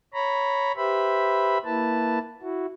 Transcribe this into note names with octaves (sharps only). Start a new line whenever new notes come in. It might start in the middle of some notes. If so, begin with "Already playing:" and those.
C#5 A#5 B5
G4 B4 C5 E5 B5
A#3 E4 B4 A5
E4 F#4